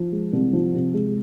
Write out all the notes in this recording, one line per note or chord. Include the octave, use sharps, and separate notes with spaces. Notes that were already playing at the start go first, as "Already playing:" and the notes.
Already playing: F3
G#3
C2
F3
C3
G#3